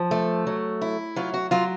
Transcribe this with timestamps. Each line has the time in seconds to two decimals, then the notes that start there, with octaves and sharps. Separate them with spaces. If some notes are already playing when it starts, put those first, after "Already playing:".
Already playing: F3
0.11 A3
0.47 F#3
0.81 E4
1.16 F#3 F4
1.34 F#4
1.51 F#3 F4